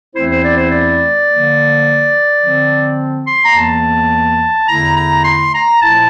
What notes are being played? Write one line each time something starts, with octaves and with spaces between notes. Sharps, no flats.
E2 E3 A3 C4 E4 C5
C5
D5
C5
D5
D3 F3 A#3
D3 F3 C4
C6
A#5
E2 E3 A#3 A5
E2 D3 A3 E4 A#5
A#5
C6
A#5
A#2 F3 A3 E4 A5